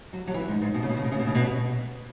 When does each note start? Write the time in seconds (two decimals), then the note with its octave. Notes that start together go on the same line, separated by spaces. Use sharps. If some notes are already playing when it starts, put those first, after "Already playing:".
0.13 F#3
0.27 F#3
0.34 E3
0.48 G#2
0.61 G#2
0.74 B2
0.83 C#3
0.89 B2
0.97 C#3
1.04 B2
1.12 C#3
1.19 B2
1.27 C#3
1.35 B2